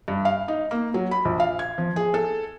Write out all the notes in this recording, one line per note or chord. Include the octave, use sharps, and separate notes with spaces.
G2
F5
D#4
A#3
F#3
B5
A#1
F5
G#6
F3
G#4
A4